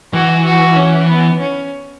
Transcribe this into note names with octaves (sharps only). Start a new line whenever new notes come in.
E3 F#4
F#4
C#4
B3
C#4